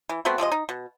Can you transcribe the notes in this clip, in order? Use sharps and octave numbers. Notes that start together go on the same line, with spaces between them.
E3
A3 B3 C4 F#4
C3 F3 G#3 D#5
D#4
B2